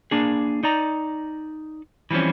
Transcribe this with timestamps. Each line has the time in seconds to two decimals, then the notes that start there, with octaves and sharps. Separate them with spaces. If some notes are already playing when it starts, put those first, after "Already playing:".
0.11 A#3 D4 G#4
0.63 D#4 D5 A#5
2.11 E3 F3 G3 C4 C#4